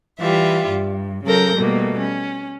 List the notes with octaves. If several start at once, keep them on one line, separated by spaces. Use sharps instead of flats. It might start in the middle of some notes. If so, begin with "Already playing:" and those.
E3 G3 F4 E5
G2
C#3 F#3 A4 A#4 G6 A#6
B2 G3 A3 A#3
C#4